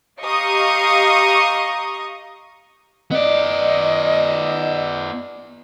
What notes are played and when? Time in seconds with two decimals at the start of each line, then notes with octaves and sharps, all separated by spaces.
0.21 G4 D#5 F5 A#5 C#6 D#6
3.11 B3 D5 D#5